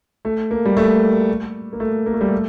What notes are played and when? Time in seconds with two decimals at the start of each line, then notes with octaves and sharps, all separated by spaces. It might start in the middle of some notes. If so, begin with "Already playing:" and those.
0.25 A3
0.51 A#3
0.65 G3
0.77 A3
1.73 A#3
1.80 A3
2.06 A#3
2.14 A3
2.21 G3
2.28 A3